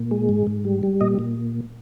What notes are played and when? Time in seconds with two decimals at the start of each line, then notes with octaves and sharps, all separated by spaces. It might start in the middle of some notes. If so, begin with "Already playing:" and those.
Already playing: A#2
0.11 G#3
0.29 G#2
0.47 G#2
0.65 G3
0.83 G3
1.01 A#2 D#5
1.19 A#2